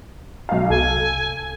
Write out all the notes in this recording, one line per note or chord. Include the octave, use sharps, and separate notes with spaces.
B1 F5
C2 A4 G#5